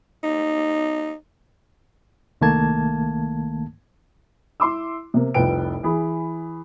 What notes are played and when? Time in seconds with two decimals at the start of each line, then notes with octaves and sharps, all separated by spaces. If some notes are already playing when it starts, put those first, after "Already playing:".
0.23 D#4
2.41 C2 D#3 A3 A#3 A5 G#6
4.60 E4 C6 D6 E6
5.14 C3 A#3
5.34 F1 C2 F4 B4 G5 D7
5.83 E3 G#4 B5